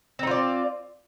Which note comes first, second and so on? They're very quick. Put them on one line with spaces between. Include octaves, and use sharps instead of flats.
C4 D#4 F4 D5